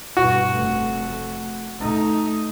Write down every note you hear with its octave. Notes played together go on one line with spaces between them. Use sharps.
G2 B2 F#4
F1 A3
A3 D#4